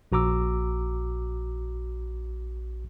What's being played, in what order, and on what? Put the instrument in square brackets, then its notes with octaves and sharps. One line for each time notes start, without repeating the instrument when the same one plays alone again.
[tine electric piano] A#1 F#4 A#5 D6 E6